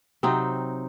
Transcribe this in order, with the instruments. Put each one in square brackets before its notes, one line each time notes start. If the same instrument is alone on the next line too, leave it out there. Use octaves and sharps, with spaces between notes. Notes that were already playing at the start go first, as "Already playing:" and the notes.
[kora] C3 F#3 C4 D#4